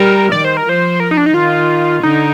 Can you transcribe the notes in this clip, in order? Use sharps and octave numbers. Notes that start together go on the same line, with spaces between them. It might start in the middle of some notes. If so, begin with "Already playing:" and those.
Already playing: G3 A#4
D#3 D5
C5
A#4
F3 C5
A#4
D#4
D4
D#4
D#3 F4
D3 D#4